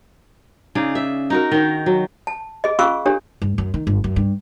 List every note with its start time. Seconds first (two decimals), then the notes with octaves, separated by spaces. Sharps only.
0.75 C#3 D#4 G#4 D5
0.95 E5
1.30 D#4 F#4 A#4
1.51 D#3 D#4
1.86 F#3
2.27 A5
2.64 G#4 D#5
2.79 C#4 F4 G#4 F5 C#6 E6
3.06 D4 G4 A4 C#5
3.42 G2
3.58 F#2
3.74 D#3
3.87 G1
4.04 F#2
4.16 G2